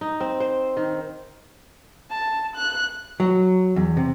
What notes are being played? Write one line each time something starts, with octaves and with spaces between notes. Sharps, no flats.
D#4
C4
C5
D#3
A5
F#6
F#3
E2
C3